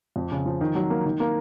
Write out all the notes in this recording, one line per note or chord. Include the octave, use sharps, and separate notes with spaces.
F2
C#3
F3
D#3
F#3
A#3
D#3
A#3